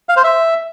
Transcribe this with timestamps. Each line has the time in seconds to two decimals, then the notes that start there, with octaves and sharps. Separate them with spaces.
0.09 F5
0.17 C5
0.24 E5